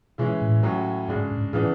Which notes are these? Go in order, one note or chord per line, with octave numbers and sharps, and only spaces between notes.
B2 E3 G#3 C#4 E4
A2
A2 F#3 C#4 E4
G#2 C#3 G#3 D4
G#2
A2 C#3 E3 B3 D4